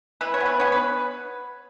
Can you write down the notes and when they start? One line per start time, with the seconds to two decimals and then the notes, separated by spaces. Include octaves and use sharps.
0.21 E3 B4
0.34 C#5
0.40 B3
0.46 B4
0.60 B3 C#5
0.72 B4